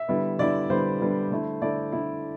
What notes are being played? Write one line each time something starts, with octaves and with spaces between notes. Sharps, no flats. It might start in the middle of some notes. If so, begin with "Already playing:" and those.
Already playing: E5
D3 G3 B3 E4
D3 G3 B3 E4 D5
D3 G3 B3 E4 C5
D3 G3 B3 E4
D3 A3 E4
D3 A3 E4 D5
D3 A3 E4